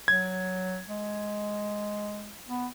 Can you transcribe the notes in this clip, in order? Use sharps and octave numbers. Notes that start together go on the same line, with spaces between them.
F#3 G#6
G#3
B3